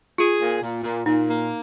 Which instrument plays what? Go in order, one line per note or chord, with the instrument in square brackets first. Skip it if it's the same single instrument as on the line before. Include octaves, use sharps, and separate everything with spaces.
[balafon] F4 [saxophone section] G#4
[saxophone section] A#2
A#2
A#2
[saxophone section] A#2 [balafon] D#4
[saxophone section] A#3